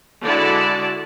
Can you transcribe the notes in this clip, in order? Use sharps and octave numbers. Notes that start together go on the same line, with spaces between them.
D3 G#3 E4 F#4 D5 A5